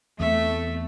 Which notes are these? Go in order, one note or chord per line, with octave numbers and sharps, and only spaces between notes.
E2 A3 C4 E5